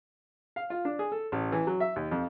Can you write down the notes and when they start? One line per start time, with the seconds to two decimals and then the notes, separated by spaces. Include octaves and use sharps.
0.56 F5
0.70 F4
0.85 D4
0.99 G#4
1.12 A4
1.32 A1
1.52 E3
1.67 F#3
1.80 E5
1.96 D#2
2.11 F2